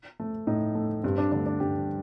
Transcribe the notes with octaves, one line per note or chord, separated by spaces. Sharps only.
A3
A2 D#4
A3
G2 C4
D4
D3 A3 D4
D4
G2 G4